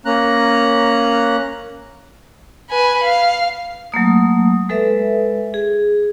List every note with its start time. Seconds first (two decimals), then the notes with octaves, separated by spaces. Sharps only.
0.05 A#3 C#4 A#5 F#6
2.70 B4 G#5
3.04 F5
3.92 F#3 A3 A#3 D#6
4.69 G#3 A4 B4 E5
5.54 G#4